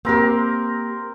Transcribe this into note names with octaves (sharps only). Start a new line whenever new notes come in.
A#3 C4 G4 A#4 C6